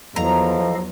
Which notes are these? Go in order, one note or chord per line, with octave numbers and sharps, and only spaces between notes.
E2 F3 F#3 A4 D#5 F5 A#5